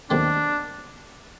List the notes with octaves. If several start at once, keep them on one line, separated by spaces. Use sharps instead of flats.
D#2 D#3 F#3 A3 C4 D4